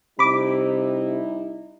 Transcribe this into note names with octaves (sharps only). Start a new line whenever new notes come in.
C3 G3 D#4 E4 B5 D6